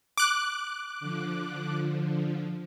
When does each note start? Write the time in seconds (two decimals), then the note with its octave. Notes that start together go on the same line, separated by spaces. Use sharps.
0.17 D6 F#6
1.00 D3 F3